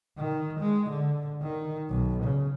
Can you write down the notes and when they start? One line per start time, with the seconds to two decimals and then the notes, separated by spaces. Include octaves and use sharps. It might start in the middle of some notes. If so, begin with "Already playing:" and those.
0.17 D#3
0.59 G#3
0.90 D3
1.42 D#3
1.89 B1
2.23 C#3